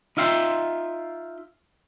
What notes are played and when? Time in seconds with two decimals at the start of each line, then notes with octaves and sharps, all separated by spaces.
0.17 D#4 F4 E5 G5 C6